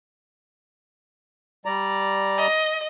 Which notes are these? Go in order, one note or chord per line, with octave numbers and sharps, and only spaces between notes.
G3 D5 A#5
D#5